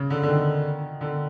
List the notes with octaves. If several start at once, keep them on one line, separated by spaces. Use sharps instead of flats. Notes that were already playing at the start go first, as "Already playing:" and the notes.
Already playing: C#3
D3
D3
D#3
D3